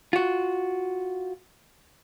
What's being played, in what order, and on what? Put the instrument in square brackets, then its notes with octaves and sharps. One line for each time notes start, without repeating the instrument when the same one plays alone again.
[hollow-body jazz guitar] F4 F#4